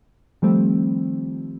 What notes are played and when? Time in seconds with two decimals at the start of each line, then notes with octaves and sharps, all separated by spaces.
0.42 D#3 F3 G3 A3 C4